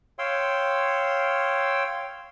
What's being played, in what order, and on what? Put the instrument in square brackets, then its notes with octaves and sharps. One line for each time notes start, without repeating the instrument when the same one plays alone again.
[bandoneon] C#5 F5 G5 C6 E6